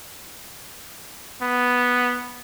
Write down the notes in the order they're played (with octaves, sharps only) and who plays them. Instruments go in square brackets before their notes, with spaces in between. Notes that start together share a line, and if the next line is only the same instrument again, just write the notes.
[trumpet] B3